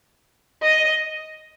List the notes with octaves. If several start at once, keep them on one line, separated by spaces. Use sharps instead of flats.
D#5